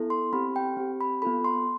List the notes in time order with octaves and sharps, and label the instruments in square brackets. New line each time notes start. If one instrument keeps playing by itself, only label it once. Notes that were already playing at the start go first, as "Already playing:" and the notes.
Already playing: [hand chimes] B3 E4 A4
C6
C4 G4 B5
G5
C4 G4
B5
B3 F4 A4 B5
C6